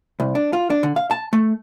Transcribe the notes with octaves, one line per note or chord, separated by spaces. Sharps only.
C2
D4
F4
D4
D3
F5
A5
A3